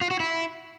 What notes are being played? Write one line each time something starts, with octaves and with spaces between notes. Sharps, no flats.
F4
F#4
E4